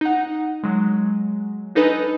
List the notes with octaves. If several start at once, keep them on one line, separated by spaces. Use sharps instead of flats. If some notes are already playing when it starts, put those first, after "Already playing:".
D#4 F#5
F#3 G#3
D4 D#4 A4 B4 D#5 G#5